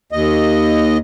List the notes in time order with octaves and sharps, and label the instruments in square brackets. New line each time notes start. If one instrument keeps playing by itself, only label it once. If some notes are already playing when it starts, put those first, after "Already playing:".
[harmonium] D#2 D#5